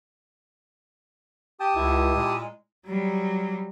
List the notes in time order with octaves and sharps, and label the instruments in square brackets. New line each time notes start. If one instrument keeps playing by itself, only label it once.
[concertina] G4 A5 D#6 [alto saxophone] G5
[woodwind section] C#2 [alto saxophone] E4
[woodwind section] A#2 G#3
[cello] F#3 G3